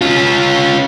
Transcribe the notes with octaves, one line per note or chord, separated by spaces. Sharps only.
C#4 F4